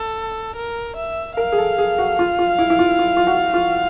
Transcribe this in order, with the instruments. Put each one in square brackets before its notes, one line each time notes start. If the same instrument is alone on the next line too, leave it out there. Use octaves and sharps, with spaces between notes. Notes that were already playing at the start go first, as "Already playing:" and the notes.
Already playing: [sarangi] A4
A#4
E5
[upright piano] A#4 [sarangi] F5
[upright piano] G#4
A4
G#4
F#4
F4
F4
E4
E4
F4
F4
F4
F#4
F4